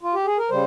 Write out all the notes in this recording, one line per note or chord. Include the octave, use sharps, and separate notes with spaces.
F4
G4
G#4
A#4
C#3 G3 C5